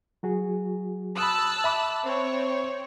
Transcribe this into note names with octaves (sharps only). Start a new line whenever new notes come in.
F#3 F#4 G#4
A5 B5 D#6 E6 F#6
E5 B5 D6
C4 C#5